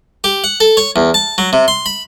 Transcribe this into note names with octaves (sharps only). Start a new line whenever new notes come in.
G4
F#5
A4
C#5
E2
A5
F#3
C3
C6
B5